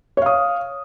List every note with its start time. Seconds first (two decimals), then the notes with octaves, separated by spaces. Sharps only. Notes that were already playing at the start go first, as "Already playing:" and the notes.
0.17 C#5
0.22 F5
0.26 D#6